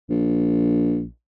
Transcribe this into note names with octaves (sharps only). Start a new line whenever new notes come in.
A#1